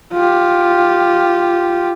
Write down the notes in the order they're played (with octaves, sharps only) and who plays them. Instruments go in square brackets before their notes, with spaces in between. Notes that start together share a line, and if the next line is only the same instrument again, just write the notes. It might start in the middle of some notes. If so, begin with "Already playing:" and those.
[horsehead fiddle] F4 G4